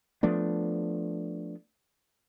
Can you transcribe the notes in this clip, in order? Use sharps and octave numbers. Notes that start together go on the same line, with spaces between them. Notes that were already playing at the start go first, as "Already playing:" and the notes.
F3 A3 B3 D4